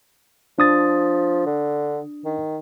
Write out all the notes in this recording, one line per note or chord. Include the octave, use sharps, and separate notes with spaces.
F3 D4 D#6 A6
D3
D#3